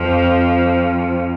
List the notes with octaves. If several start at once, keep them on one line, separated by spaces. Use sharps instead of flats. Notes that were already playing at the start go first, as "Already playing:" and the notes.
Already playing: F2 F3